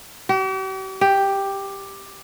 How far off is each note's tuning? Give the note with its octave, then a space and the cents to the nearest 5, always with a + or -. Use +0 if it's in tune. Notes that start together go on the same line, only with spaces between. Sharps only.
G4 -45
G4 +5